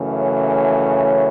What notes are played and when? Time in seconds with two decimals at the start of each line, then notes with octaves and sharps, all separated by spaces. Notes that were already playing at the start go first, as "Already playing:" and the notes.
Already playing: F#2 C#3 E3 A3
0.18 C#5
0.49 C#5